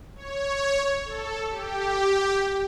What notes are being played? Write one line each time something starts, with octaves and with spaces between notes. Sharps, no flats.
C#5
A4
G4